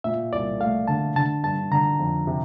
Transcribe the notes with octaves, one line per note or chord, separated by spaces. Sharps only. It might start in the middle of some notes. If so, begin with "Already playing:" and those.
A#2 E5
C2 D5
A3 F5
D3 A5
D3 A5
G2 A5
D3 A#5
F2
C3